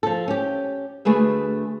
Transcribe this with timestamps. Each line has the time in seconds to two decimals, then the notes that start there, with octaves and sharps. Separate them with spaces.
0.03 F3 A4
0.28 C#4 G4
1.05 D2 A3 G#4 B4 E5